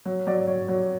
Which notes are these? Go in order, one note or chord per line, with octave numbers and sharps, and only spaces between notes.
F#3
F#3 D5
F#3 C#5
F#3